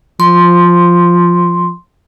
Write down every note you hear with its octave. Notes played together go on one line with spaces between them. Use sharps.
F3 C6